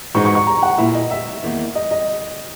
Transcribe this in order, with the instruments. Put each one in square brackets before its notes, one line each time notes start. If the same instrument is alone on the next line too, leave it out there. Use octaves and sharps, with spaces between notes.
[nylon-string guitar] G#2 E3 G#3 D#4 F#4 [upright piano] C#6
[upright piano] C#6
C#6
A#5
F#5
[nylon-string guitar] A#2 A#3 E4 [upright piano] E5
[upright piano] D#5
E5
[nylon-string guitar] E2 D#3 A#3
[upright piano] D#5
D#5